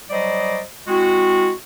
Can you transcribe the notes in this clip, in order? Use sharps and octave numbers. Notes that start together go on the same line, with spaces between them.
F#3 G3 C5 D5 D#5
G#3 C4 E4 F#4